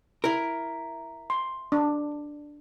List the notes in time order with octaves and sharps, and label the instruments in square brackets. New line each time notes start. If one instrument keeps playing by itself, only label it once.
[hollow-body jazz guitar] E4 A#4
[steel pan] C6
D4